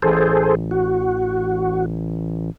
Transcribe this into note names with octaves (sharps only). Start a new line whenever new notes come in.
A1 G#4 A4 C5
F#4